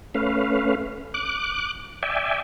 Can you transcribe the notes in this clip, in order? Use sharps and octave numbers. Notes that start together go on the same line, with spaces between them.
A3 C#4 B4 F5
D6 F#6
D5 E5 G5 G#5